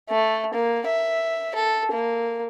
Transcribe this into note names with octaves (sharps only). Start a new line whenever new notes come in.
A3
A#3
E5
A4
A#3